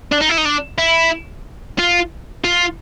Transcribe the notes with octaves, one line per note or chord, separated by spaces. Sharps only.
D4
D#4
E4
D#4
D4
E4
F4
F4